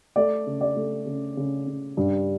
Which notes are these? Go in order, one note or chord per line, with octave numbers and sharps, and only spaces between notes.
A3 D5
C#3
D5
A3
C#3
C#3
C#3
G2